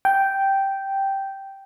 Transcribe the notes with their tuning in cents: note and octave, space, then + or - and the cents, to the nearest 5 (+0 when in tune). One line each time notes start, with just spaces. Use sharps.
G5 -5